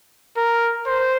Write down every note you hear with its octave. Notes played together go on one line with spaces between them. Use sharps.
A#4
C5